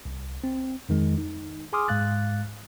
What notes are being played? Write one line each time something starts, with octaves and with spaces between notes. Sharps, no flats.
C2
C4
F2 D#3 G#3
D#4
G#4 G#5 C6 D6 D#6 F6
G#2 G#3 F5 F#6 A6